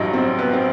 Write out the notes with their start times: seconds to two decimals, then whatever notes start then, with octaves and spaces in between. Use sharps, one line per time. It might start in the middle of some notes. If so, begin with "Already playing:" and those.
Already playing: A1 G2 F#3 D#4
0.13 C4
0.39 B3
0.53 C4